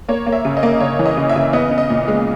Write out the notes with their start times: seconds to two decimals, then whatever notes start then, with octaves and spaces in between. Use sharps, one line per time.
0.09 A#3 C#5
0.26 A#3
0.32 E5
0.45 C#3
0.57 D#5
0.63 A#3
0.80 C#3 C#5
0.99 E3
1.06 D#5
1.17 C#3
1.29 E5
1.36 C#3
1.53 B3 D#5
1.71 B3
1.78 D#5
1.90 A#2
2.08 G#3